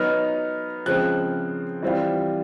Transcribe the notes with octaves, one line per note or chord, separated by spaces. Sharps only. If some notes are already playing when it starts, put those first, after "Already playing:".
Already playing: F#3 B3 D#4 F6
C#3 F3 G#3 C4 F#6
E3 G3 C4 F4